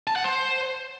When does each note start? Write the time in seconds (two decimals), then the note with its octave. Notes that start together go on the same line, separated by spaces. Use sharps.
0.07 A5
0.16 F#5
0.24 C5